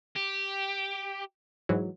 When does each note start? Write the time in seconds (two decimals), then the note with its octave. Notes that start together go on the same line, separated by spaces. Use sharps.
0.16 G4
1.69 G#2 E3 F#3